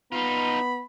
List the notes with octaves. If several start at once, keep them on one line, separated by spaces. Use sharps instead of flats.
B3 D#4 F4 B5